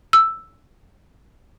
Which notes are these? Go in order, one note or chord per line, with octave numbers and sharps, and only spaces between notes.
E6